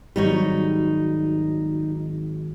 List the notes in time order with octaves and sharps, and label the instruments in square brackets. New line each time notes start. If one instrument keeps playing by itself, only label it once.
[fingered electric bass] G#1 F#3 [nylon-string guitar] G3 D#4 C#5